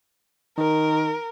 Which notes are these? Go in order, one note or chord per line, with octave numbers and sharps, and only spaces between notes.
D#3 A#4